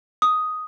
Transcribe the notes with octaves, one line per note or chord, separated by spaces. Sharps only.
D#6